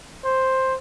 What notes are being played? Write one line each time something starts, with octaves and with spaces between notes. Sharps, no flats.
C5